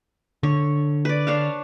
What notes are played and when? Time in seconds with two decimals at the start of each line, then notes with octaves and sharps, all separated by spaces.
0.43 D3 C#5
1.05 B4 D5
1.27 D4 C#5 F5